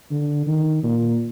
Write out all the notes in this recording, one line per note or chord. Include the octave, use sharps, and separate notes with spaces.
D3
D#3
A#2